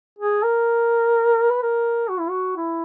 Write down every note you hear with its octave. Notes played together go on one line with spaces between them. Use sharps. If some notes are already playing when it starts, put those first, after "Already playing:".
G#4
A#4
B4
A#4
F#4
E4
F#4
E4